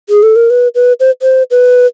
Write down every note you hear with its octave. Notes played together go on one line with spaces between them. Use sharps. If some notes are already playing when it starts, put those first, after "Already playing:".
G#4
A4
A#4
B4
B4
C5
C5
B4